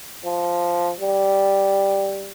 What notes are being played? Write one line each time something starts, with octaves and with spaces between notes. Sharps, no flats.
F3
G3